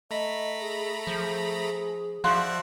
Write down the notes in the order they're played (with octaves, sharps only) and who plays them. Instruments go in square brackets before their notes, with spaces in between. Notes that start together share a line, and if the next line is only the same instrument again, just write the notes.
[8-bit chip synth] A3 A#5 B5 [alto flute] D#5
[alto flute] G#4
[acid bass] F3 [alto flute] G#4
[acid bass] F3 [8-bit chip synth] F#4 D5 E5 [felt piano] F5 C6 F#6